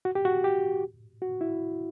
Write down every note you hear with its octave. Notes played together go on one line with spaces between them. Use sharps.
F#4
G4
F#4
G4
F#4
E4